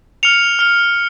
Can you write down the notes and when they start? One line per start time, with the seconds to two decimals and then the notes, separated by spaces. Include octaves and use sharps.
0.23 F6 C#7 F7
0.59 F6 C#7 F7